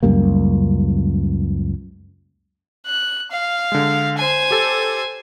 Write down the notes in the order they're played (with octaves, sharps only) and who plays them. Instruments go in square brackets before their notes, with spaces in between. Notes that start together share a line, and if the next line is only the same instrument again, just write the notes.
[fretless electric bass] C#2 F#2 G3 A#3
[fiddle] F#6
F5
[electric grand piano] D3 G#3
[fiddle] C5 G#5
[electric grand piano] G4 A4